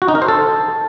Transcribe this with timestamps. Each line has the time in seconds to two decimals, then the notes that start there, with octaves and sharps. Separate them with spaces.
0.02 F#4
0.08 D#4
0.15 A#4
0.22 C5
0.28 A4